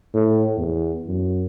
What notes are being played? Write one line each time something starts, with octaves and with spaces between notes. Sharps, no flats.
A2
E2
F#2